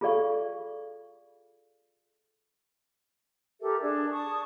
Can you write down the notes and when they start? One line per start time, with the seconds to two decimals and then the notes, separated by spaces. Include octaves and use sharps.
0.01 F4 G#4 A4 D5 F5 C#6
3.61 G4 A4 A#4 E5
3.81 D4 G#4 D5
4.10 A5 C#6 D#6